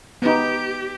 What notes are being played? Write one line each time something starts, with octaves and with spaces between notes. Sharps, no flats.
B3 D#4 G4